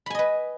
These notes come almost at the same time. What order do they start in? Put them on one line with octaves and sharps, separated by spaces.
B5 G#5 D#5 B4